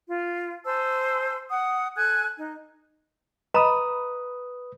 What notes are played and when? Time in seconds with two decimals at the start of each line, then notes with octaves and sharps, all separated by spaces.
0.08 F4
0.65 C5 G#5 A5 E6
1.50 F#5 D#6
1.96 A4 G#5 F#6 G#6
2.36 D#4
3.54 B4 D#5 A#5 B5 D#6